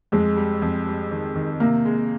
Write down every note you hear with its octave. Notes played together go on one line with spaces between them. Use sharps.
F2 G#3
G3
F2
G3
D#3
D#3
C3 A#3
G#3